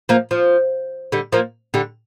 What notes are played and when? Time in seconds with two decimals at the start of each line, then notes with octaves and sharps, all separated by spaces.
0.09 F3 A#3
0.31 F3
1.12 D3 G3
1.32 F3 A#3
1.74 D3 G3